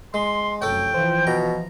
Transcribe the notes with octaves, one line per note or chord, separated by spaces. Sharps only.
G#3 C6
F1 F#2 A4 C#5 G5
E3 F3 C5
B2 A#5